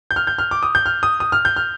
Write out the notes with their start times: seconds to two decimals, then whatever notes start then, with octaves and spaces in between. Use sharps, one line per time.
0.11 G6
0.16 F6
0.27 G6
0.39 F6
0.51 D6
0.63 D#6
0.75 G6
0.86 F6
1.03 D#6
1.20 D#6
1.32 F6
1.45 G6
1.56 F6